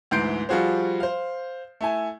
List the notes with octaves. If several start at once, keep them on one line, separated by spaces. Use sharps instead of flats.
D2 G#2 E3 G6 C7 D7
F3 G3 F4 F#4 G#4 C5
C5 F5
A3 E4 G#5